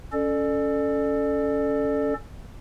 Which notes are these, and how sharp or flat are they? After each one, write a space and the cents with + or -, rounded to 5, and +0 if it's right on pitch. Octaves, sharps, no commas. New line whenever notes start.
C#4 +15 A4 +0 D5 +30